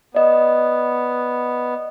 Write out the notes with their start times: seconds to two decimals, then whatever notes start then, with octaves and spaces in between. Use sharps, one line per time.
0.15 B3 D5 D#5